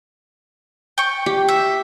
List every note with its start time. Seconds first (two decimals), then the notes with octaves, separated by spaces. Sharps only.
0.98 G5 C#6
1.26 G4
1.49 E5